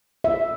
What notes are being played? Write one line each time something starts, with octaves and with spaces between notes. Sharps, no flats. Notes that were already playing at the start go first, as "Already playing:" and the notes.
E5